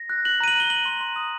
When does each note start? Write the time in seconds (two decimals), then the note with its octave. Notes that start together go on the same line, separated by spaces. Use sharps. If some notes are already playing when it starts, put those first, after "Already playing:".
Already playing: A#6
0.09 F#6
0.25 F#6 F#7
0.40 A#5 D#7
0.48 F#7
0.55 A#5 G7
0.70 F#6 F#7
0.85 C6
1.01 C6
1.16 D#6